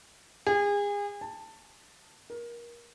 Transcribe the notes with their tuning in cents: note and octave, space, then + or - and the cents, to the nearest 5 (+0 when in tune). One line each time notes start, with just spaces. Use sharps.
G#4 -35
A5 +15
A#4 +25